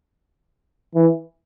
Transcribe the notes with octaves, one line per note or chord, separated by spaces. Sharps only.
E3